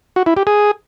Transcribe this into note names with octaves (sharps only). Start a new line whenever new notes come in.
F#4
E4
G4
G#4